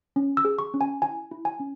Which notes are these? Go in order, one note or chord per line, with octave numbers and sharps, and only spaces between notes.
C#4
E6
G#4
C#6
C#4
G#5
E4 G#5
E4
G#5
C#4